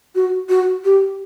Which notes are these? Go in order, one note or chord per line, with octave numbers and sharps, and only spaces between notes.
F#4
F#4
G4